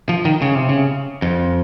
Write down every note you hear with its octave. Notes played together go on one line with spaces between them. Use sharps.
F3
D#3
C#3
C3
C#3
F2